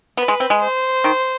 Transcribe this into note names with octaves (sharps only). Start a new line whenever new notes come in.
B3 B4
G#3
C4
G#3
C5
D#3